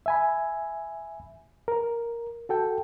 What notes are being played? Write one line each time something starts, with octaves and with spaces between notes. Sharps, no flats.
E5 G#5 B5
A#4
F#4 A4 G5